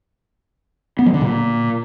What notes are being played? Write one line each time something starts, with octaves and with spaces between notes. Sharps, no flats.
B3
F#3
D3
A#2